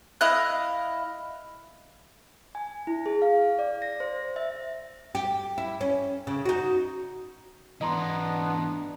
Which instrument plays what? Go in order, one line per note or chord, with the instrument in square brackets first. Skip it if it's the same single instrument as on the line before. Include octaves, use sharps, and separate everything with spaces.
[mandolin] E4 D#5 F5 F#6
[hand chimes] G#5
E4
G#4
F5
D5
A#6
C5
E5
[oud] G4
E4
C#4
C#3
D#4 F#4
[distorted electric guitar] G#2 E3 [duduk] B3 [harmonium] D4 [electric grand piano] D#5 A#5 C6